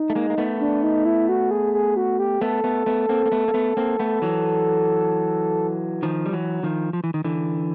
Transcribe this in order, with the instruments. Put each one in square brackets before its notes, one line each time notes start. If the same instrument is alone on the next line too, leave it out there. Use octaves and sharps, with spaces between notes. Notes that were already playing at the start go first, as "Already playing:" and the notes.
Already playing: [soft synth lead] D#4
[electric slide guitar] A3
G#3 A#3
A#3
A3 B3
[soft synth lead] D4
D#4
E4
F#4
G#4
G#4
F#4
G4
[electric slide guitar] A3 B3 [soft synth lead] A4
[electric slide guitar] A3 B3
A3 B3
A#3 C4
A#3
A3 B3
A#3
A3 B3
A#3 C4
A3 B3
E3 F#3
D#3 F3
G3
E3 F#3
D#3 F3
F3
E3
D#3
D3 E3